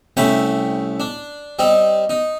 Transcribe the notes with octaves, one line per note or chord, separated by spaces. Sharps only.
C2 A3 C#4 G5 B5
D4
G3 C4 D#4
D#4